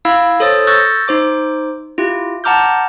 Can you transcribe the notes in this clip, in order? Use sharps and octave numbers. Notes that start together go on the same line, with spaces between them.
E4 F5 B5 E6 G#6
A4 C5 C#5 D#6 E6 A6
C#6 E6 F#6 G6 A6 A#6
D#4 C5 D6
E4 F4 G4
F#5 A5 A#5 D6 F6 G6